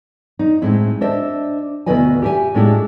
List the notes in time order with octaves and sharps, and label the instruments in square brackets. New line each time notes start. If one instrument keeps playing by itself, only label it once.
[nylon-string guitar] D#4
A2 G#3 C4 E4
D4 C5 D#5 E5
D2 B2 E4 B4 D#5 G#5
G4 E5 G#5
A2 G#3 D4 E4 G4 G#4